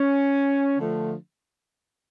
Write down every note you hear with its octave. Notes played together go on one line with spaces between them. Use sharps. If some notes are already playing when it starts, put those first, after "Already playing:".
Already playing: C#4
D3 F3 A3